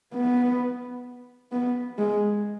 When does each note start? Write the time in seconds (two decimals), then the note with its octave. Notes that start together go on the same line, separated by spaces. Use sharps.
0.14 B3
1.52 B3
1.99 G#3